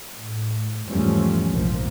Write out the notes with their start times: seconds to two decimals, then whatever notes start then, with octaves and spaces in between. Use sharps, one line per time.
0.16 A2
0.86 E2 G#2 F3 G3 A3 C#4
1.49 F1 A#1 G#2 F3 A#3